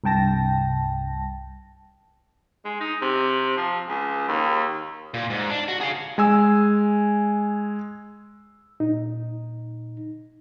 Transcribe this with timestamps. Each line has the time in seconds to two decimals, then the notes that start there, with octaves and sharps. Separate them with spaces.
0.04 C2 G2 G5 A5 A#6
2.65 G#3
2.80 D#4
3.02 C3
3.57 F3
3.88 C#2
4.28 D#2
5.14 A#2
5.30 G#2
5.50 D4
5.68 F#4
5.81 G#4 F5
6.18 G#3 G#5 E6
8.80 A#2 D#4